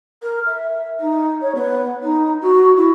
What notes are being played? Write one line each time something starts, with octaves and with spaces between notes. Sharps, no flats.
A#4
E5
D#4
C#5
B3
D#4
F#4
E4